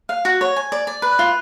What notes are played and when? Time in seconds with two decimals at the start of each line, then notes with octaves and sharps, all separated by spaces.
0.09 F5
0.25 F#4
0.41 C#5
0.56 G#5
0.72 D5
0.87 D5
1.02 B4
1.19 F4